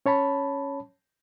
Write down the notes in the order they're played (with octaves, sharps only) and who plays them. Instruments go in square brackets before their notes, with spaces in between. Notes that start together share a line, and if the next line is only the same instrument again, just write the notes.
[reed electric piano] C#4 C#5 A5 B5